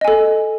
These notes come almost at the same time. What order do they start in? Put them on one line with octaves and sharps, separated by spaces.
D#5 G#5 A4